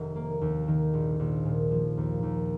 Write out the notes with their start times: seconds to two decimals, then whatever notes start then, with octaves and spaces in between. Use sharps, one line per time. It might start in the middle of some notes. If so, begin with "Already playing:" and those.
Already playing: F1 D#3
0.16 A#3
0.41 D#2
0.68 D#3
0.93 A#1
1.19 A#1
1.45 A#2
1.71 F3
1.97 D#2
2.23 D#2